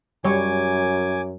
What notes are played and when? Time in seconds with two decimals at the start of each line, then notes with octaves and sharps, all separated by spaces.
0.25 F#2 G3 C#5 G#5 D6